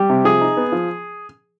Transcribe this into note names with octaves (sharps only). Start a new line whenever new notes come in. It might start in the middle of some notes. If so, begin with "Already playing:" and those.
Already playing: G3 G4
C3
F3 G#4
D#4
B3
F3